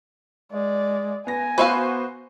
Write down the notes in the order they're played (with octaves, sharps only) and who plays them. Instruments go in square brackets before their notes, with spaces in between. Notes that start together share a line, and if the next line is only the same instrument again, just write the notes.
[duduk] G#3 [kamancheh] D5
[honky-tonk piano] B3 A#6 [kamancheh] G#5
[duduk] B3 [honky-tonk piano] F#4 C5 C#6 [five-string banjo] B4 E5 F5